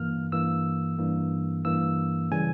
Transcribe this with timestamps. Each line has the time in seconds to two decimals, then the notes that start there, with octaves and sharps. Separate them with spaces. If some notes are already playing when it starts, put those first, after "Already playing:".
Already playing: G2 E3 A#3 F6
0.32 G2 E3 A#3 E6
0.99 G2 E3 A#3
1.65 G2 E3 A#3 E6
2.31 C#3 E3 G3 G#5